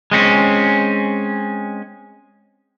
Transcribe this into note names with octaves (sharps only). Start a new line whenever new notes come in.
G#3 C4 C#4